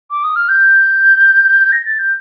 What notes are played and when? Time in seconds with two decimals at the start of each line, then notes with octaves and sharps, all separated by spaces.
0.11 D6
0.24 D#6
0.36 F6
0.49 G6
1.72 A#6
1.85 A6
1.99 G6